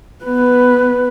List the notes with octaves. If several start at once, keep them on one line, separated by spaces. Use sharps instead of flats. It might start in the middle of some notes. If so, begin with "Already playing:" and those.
B3 B4